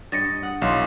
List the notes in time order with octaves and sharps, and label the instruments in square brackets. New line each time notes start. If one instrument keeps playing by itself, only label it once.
[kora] G2 D#5 [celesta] A6 A#6 C#7
[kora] F#5 [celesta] D#6
[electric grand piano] B1 [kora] E3 [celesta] F5 C6